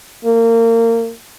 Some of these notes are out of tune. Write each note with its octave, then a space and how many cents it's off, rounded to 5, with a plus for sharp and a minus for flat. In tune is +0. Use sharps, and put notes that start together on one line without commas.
A#3 -25